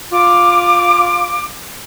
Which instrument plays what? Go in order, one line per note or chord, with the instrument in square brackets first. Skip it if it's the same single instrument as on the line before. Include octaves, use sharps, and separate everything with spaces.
[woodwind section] F4 D6